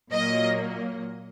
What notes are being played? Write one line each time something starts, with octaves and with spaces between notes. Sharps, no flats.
A#2 F#3 A#3 D#5